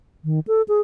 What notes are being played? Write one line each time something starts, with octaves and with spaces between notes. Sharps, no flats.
D#3
A4
G#4